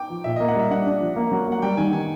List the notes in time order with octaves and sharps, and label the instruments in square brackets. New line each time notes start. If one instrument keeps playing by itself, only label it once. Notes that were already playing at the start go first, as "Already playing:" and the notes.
Already playing: [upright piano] G5 D6
[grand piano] F3
[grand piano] A#2 [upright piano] E5
[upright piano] D#5
[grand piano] A#3
[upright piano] F#5
[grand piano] G3 [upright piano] E5
[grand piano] D4 [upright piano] F#5
[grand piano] D4
F3
A#3
F#3
[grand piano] A#3 [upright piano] F#5
[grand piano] G3 [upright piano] G5
[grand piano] D#3 [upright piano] G#5
[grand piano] D#3 [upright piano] G#5